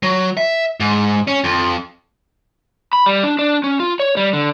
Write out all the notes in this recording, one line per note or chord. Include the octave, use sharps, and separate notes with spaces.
F#3
E5
G#2
C#4
F2
B5
G3
D4
D4
C#4
F4
C#5
G3
D3